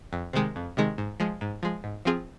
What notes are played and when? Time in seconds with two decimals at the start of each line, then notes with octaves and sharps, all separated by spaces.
0.13 F2
0.33 C3 D#3 G#3
0.56 F2
0.77 C3 D#3 G#3
0.98 G#2
1.20 F3 G#3
1.41 G#2
1.63 F3 G#3
1.84 G#2
2.05 F3 C4 F4 G#4